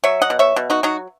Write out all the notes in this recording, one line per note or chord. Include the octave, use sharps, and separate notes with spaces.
F#3 C#5 E5
D#5 F#5
B2
C#5 E5
B2
D#4 F#4
F#3 D#4 F#4